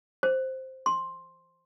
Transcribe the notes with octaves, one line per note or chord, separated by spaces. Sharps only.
C5
C6